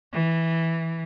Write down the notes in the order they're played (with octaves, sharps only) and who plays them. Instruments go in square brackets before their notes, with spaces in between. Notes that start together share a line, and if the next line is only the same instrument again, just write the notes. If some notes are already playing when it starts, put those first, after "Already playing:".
[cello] E3